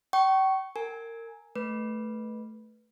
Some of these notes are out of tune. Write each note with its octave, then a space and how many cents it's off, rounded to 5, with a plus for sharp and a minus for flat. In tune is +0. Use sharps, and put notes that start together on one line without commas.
G5 -40 C#6 +0
A#4 -25 G#5 +0
A3 +0 B4 -10